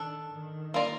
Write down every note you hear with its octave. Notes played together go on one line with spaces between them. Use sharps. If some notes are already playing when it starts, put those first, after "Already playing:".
Already playing: D#3 D4 A4
D#3
A#3 F4 A#4 D5